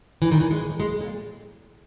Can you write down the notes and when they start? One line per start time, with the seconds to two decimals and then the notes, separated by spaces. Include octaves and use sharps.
0.22 E3
0.31 D#3
0.40 E3
0.51 G#3
0.80 G#3
1.01 A#2